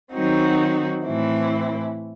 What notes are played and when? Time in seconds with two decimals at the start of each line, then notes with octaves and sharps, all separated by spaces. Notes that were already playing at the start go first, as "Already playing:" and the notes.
0.12 D#3 F#3 C4 D#4 F#4
1.05 A2 E3 C4 E4